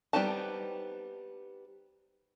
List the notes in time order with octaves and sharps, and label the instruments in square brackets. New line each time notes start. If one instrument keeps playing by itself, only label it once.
[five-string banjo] G3 B3 C4 D#4 A5